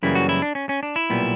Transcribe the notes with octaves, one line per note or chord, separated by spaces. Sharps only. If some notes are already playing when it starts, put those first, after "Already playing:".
F#2 C#3 E3 G3 A#3 E4
F#4
E4
D4
C#4
C#4
D4
E4
B1 A#2 G3 B3